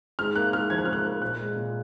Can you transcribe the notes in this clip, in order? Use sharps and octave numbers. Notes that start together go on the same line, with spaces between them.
G#2 F6
A#3 F#6
G#2 F6
F3 G#6
F#6
G#2 F6
F#6
A#3
A#2 F#6
G#3
A#2